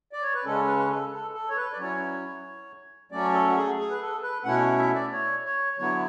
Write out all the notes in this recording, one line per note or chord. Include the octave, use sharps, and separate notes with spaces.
D5
C#5
B4
C#3 G#3 C#4 A4
B4
B4
A4
A4
A4
C#5
B4
D5
F#3 C#4 E4 C#5
F#3 A3 C#4 D5
A4
F#4
G#4
G#4
B4
A4
B4
B2 A3 C#4 E4 F#5
E5
D5
C#5
C#5
D3 F#3 B3 E4 C#5